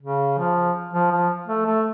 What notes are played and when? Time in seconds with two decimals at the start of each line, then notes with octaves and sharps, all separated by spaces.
0.02 C#3
0.38 F3
0.93 F3
1.12 F3
1.47 A3
1.66 A3